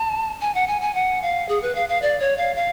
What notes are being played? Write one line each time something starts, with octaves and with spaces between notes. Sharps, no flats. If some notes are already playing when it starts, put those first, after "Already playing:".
Already playing: A5
G#5
F#5
G#5
G#5
F#5
F5
G#4
B4
F5
F5
D5
C#5
F5
F5